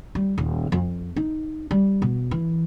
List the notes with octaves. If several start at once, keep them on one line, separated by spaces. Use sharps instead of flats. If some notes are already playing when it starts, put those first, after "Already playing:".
G3
D#1
F2
D#4
G3
B2
E3